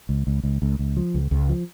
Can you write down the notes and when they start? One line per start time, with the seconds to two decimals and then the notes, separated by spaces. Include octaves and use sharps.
0.09 C#2
0.27 C#2
0.43 C#2
0.62 C#2
0.79 C#2
0.97 F3
1.14 C#2
1.31 C#2
1.49 F3